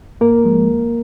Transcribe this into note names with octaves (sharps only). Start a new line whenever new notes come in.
G#2 A#3 A#4
F3 G#3
D#2